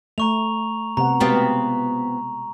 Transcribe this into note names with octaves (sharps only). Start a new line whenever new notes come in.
A3 A#5 C#6 F7
C3 B3 F#5 A#5
B2 G#3 B3 C4 F4 G4